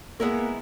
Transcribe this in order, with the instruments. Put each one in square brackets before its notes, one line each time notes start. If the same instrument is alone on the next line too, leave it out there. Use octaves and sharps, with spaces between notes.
[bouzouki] G#3 B3 E4 A#4 [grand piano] A#3